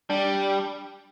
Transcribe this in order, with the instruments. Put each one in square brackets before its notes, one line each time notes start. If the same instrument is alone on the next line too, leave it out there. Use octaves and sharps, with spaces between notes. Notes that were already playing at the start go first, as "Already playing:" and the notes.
[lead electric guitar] G3 [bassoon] D4